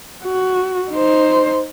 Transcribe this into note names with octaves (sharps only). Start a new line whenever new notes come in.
F#4
D#4 C5